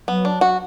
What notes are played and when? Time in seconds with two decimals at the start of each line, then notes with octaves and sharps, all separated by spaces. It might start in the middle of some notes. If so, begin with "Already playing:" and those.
0.08 F#3 B3
0.25 D4
0.41 F#4